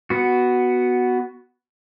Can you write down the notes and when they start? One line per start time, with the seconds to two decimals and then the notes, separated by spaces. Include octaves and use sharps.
0.10 B3 F#4